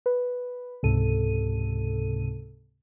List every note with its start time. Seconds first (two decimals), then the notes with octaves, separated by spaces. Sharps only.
0.06 B4
0.83 C#2 G#2 C3 A4 D#7